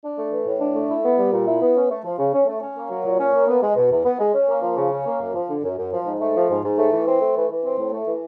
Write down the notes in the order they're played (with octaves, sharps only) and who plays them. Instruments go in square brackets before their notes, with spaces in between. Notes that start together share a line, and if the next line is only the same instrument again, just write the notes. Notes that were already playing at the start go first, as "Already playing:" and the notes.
[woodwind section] D4
A3
E3
A2
D4
A3
E4
B3
G3
A#2
E4
B3
C#4
A3
F3
C#3
C#4
A3
C#4
A#3
F#3
A#2
C#4
A#3
B3
G#3
B2
E2
B3
G#3
C#4
A#3
F3
C#3
C#4
A#3
F#2
F3
D3
F#2
F#2
F3
G#2
A3
F3
G#2
G#2
A3
E3
C4
A3
E3
E3
C4
A2
A3
E3